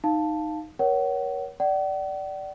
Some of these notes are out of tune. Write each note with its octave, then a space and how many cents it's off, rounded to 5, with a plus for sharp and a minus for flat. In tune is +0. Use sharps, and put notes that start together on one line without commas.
D#4 +0 F5 +0 A5 +0
A#4 +35 C#5 +10 F#5 +30
D5 +0 F#5 +45